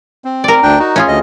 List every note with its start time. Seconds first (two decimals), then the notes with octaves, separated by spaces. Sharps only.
0.25 C4
0.44 A#4 D5
0.63 D2 D4 G5
0.79 D#4 F#4
0.96 C#4 F4 G#4
1.08 D2 D#5